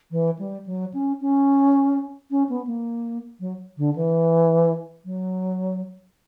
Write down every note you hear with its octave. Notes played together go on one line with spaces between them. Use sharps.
E3
G3
F#3
C#4
C#4
C#4
B3
A#3
F#3
D3
E3
F#3